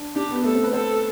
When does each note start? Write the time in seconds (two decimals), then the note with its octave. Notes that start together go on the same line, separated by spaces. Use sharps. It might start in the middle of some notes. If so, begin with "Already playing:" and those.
Already playing: D4
0.16 D4 G4
0.31 B3
0.44 A3 A4
0.55 C4
0.63 B4
0.73 A4 C5